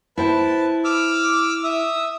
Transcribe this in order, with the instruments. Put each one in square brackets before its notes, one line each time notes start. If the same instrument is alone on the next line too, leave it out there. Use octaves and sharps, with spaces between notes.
[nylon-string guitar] E4 C5 G5 [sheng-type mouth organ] B4 A5
[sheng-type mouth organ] D6 E6 F6
E5 D#6 E6